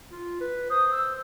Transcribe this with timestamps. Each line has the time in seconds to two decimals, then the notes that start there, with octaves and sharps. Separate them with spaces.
0.12 F4
0.41 B4
0.70 C5 D#6
0.92 E6